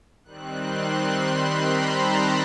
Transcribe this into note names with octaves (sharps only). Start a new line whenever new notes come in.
D#3 G3 C4 F#6
C6
C6
B5
A#5
A5